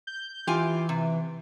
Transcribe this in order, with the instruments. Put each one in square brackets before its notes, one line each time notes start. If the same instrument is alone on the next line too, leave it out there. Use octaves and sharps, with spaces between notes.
[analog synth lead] G6
[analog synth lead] E3 [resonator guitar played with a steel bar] F4 G4 G#5
[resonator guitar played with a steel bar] C3